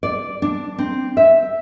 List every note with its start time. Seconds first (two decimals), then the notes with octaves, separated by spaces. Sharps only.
0.03 D5
0.42 D4
0.78 C4
1.17 E5